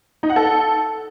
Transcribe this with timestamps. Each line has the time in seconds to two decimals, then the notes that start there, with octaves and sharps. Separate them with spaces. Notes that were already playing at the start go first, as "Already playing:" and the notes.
0.23 D#4
0.30 F#5
0.36 A4